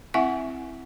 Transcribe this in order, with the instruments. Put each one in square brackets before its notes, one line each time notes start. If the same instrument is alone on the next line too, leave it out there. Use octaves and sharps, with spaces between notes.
[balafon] C4 E4 E5 F#5 G#5 C#6